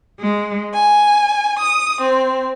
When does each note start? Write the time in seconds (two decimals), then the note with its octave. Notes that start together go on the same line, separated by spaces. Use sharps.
0.19 G#3
0.73 G#5
1.59 D#6
2.00 C4